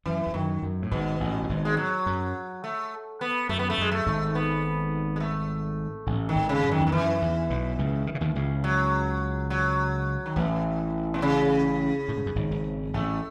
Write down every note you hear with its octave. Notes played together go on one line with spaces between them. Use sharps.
F#2 E3
E2
F#2 D#3
F#2
A2
G#1 G#2 B2
A1 A2
A2
G#1 G#2
G#3
F#3
F#2
A3
B3
F#2 A3
B3
A3
F#2 G#3
A3
G#1 G#2
B3
G#3
A3
A1 A2
D#3
G#1 G#2
C#3
F#2
D#3
E2
D#3
F#2 E3
E2
B1 B2
C#2 C#3
D#3
C#3
D#2 D#3
C#2 C#3
F#3
F#3
D#3
A1 A2 E3
B2
C#3
A2
G#2
F#2
G#1 G#2
G#1 G#2
A1 A2 A3